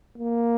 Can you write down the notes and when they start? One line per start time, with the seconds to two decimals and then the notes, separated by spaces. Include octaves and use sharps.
0.18 A#3